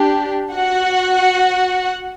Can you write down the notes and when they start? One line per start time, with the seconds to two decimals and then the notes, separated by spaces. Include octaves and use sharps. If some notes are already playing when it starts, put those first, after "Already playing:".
Already playing: D4 G4
0.53 F#4 F#5